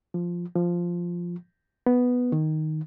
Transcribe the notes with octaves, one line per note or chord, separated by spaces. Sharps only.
F3
F3
B3
D#3